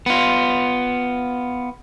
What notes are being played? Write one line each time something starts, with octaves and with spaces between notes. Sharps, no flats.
B3 F4